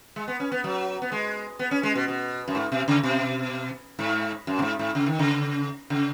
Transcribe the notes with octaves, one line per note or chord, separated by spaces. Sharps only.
G#3
B3
C#4
B3
F#3
B3
G#3
B3
C#4
G#3
B2
B2
F#2
G#2
B2
C#3
B2
G#2
F#2
B2
G#2
G#2
C#3
D#3
C#3
C#3